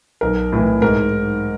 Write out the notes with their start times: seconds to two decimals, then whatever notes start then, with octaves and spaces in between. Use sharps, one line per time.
0.21 B1 A#4
0.52 A2 E3
0.81 G#2 A#4